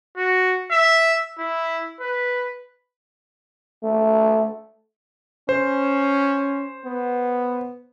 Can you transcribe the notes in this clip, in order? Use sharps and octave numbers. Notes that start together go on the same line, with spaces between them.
F#4
E5
E4
B4
A3
C#4 C5
B3